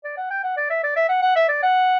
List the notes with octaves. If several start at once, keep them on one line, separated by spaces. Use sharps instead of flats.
D5
F#5
G5
F#5
D5
E5
D5
E5
F#5
F#5
E5
D5
F#5